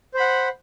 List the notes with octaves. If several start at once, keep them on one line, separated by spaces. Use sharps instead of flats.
C5 F#5 B5